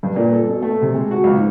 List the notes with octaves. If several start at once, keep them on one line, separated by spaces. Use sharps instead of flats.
G2
A#2
A4
B2
A3
C3
G#3
F#4
C#2
G#2